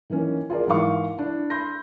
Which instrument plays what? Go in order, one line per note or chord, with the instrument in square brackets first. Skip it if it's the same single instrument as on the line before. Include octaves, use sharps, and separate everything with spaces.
[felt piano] D#3 E3 A#3 C#4
F4 G#4 A#4 D5
G#2 E3 A#4 F5 C#6
D4 E4
B5 C6 G6 A#6